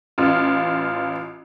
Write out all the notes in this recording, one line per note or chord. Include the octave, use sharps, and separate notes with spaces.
A1 F4